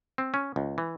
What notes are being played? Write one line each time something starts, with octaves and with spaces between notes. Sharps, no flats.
C4
C#4
C#2
E3